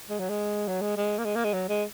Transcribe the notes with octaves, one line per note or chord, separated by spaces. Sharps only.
G#3
F#3
G#3
F#3
G#3
G#3
A#3
G#3
A#3
G#3
F#3
G#3